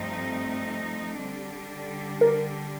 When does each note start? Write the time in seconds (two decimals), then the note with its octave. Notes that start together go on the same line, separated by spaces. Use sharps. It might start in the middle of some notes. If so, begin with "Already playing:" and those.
Already playing: G2 F3 A3 C4 D#4
1.18 D3 G3 D4
2.21 A#4